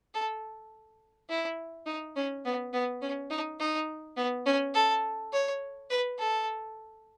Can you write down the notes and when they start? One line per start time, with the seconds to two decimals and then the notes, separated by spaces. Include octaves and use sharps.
0.14 A4
1.29 E4
1.87 D#4
2.16 C#4
2.45 B3
2.73 B3
3.02 C#4
3.31 D#4
3.60 D#4
4.17 B3
4.46 C#4
4.75 A4
5.33 C#5
5.90 B4
6.19 A4